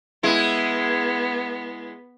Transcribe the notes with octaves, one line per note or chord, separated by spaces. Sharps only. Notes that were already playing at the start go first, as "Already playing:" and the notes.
G#3 B3 E4